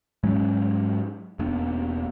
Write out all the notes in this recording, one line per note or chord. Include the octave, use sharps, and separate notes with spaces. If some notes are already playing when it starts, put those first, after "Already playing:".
G#2 F#3 G#3 C#4
E1 A#3 B3 D4